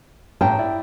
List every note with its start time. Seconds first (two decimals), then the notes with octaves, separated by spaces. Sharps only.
0.41 A1 G5 A5 A#5
0.59 E4 D5